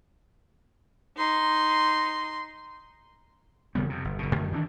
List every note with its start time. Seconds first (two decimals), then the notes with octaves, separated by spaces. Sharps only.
1.17 D#4 C6
3.75 E1 C#3 G3 B3
3.89 F2 C3
4.05 G1
4.19 F#1 B2
4.35 F#2 D3 D#3 A3
4.52 D#3 E3 A#3 D4